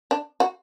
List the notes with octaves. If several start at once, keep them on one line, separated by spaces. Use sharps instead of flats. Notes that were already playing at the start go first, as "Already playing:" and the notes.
D4
F#4